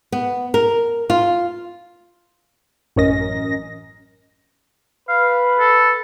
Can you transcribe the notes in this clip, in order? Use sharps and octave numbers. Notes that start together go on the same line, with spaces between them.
B3
A#4
F4
A1 F#2 C#4 A#4 D#5 A#6
B4 F5
A4